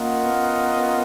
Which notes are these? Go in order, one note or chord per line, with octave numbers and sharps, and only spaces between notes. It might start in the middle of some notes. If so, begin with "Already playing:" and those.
Already playing: A#3 C#4 F4 A#4 D#5 F#5
B3